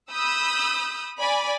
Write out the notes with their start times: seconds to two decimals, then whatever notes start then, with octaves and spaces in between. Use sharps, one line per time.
0.12 B5 D#6 E6 G6
1.18 D5 G#5 B5